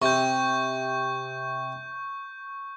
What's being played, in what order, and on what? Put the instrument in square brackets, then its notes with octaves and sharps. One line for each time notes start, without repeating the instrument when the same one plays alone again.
[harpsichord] C3 [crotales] C#6 G6